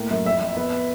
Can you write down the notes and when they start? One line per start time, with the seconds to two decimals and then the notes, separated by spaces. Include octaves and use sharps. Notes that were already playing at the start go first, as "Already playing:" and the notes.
Already playing: A2 A#3
0.11 F#2
0.25 F2 E5
0.41 F2
0.57 B3